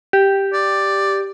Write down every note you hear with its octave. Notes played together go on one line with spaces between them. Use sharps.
G4
D5